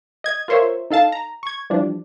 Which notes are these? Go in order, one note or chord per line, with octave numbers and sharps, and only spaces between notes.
D#5 G#6
F4 A#4 C5 C#5 E5
D#4 A4 F5 A5
A#5
C#6 G#6
E3 F3 G3 D4